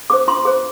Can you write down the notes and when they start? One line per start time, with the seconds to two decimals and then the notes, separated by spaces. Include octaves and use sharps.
0.10 G#4 C5 D6
0.28 F4 C6
0.45 G#4 C5